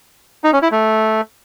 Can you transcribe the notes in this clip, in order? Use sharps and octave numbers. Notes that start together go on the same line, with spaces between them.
D#4
C#4
E4
A3